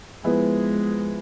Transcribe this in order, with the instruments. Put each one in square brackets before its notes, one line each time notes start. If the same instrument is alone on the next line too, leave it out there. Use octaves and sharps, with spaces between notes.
[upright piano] F3 B3 E4 G#4 B4 [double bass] G#3